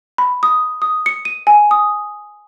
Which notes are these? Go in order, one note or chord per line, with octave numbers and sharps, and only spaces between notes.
B5
D#6
D#6
C#7
D#7
G#5
D#6